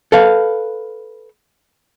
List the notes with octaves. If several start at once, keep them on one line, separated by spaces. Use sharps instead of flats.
A4 B4 F5